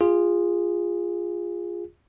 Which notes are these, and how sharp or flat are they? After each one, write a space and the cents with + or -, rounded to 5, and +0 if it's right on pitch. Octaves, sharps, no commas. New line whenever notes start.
F4 +0 G#4 -20